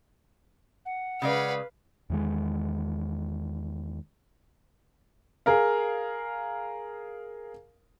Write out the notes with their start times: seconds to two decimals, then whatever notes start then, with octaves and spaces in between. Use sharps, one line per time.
0.85 F#5
1.22 C#3 G#3 B4 D5 F5
2.10 E2 D#3 G#3
5.46 G#4 A#4 F5